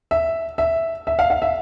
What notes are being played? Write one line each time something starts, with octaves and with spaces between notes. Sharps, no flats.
E5
E5
E5
F5
F5
E5